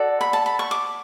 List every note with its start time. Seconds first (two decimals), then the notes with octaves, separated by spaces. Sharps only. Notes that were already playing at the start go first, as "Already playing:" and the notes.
Already playing: F#4 A4 D5
0.21 B5
0.33 A5
0.46 B5
0.59 C#6
0.71 D6